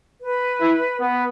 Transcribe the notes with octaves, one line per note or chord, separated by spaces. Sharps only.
B4
E4
B3 B4